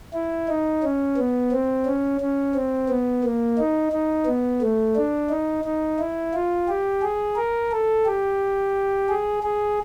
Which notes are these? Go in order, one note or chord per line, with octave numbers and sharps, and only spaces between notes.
E4
D#4
C#4
B3
C4
C#4
C#4
C4
B3
A#3
D#4
D#4
B3
A3
D4
D#4
D#4
E4
F4
G4
G#4
A#4
A4
G4
G#4
G#4